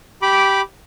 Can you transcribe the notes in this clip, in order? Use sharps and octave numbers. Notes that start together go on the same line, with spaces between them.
G4 B5 D6